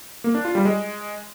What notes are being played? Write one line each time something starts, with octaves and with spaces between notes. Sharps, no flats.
A#3
D4
F4
G3
G#3